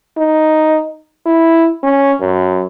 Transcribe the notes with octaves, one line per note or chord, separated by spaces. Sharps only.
D#4
E4
C#4
F#2